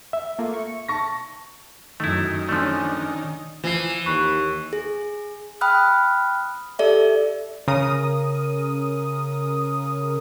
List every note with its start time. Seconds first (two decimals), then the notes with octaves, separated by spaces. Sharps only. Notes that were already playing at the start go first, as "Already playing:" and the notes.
0.13 E5
0.38 A3 A#3 F4
0.54 C#6
0.88 A5 C#6 A#6
2.00 F#2 D#3 A3 E4
2.49 F3 A3 C#4 D4
3.64 E3 F3 C7
4.06 D#2 B5 C#6 F#6
4.73 G#4
5.61 G5 B5 D#6 F6 F#6
6.79 G4 A4 D5 E5
7.68 C#3 A#4 D#6